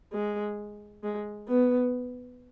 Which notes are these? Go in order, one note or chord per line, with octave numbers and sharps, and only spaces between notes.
G#3
G#3
B3